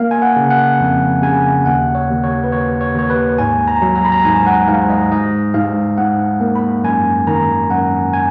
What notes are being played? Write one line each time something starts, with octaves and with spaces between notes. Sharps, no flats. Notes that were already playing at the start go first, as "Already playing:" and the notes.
Already playing: A#3 F5
G#5
F#5
C#3
F#5
F2
C#3 G#5
D#2 F#5
C#5
D#2
C#5
B4
D#2 C#5
C#5
D#2 C#5
B4
G#2 G#5
A#5
F#3
A#5
B5
A#5
G#2 G#5
F#5
G#2 F5
D#5
G#2 D#5
G#2 F5
G#2 F#5
A#3
B5
F#2 G#5
D#3 A#5
F#2 F#5
G#5